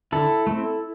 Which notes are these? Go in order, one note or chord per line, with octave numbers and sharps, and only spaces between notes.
D3 E4 A4
A3 C4